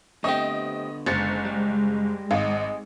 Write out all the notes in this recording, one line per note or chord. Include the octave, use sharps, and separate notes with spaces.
D3 A3 B3 C4 G4 D#5
F#1 G#3 C5 A6 C#7
G3
G#1 G#4 D#5 F5